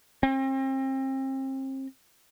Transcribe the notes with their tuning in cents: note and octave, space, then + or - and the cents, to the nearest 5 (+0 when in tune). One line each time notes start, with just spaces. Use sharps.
C4 +35